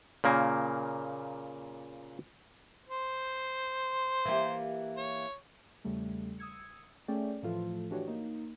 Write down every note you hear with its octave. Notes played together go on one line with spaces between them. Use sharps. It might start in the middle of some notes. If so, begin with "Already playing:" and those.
A#2 C#3 A#3
C5
E3 A#3 G4
C#5
E2 C#3 G3 A3
D#6 E6 G#6 C#7
A3 C#4 G#4 D5 G5
A2 E3 F3 A3 F4 A4
E3 D4 F#4 G4 C#5
A#3 D#4